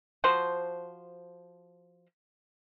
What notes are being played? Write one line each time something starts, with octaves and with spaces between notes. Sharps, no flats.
F3 F#4 C5